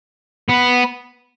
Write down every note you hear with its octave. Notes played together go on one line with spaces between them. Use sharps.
B3